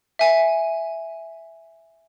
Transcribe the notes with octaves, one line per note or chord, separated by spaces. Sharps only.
E5 G#5